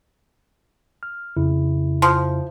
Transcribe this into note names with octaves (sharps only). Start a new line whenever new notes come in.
F6
F2 C#3 E4
F3